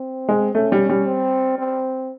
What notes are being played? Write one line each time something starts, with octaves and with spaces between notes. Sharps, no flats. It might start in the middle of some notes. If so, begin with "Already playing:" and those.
Already playing: C4
G#3
A3 C#4
G3
G3
C4
C4